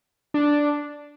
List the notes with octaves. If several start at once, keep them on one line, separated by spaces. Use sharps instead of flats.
D4